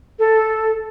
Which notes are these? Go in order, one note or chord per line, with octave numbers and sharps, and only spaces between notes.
A4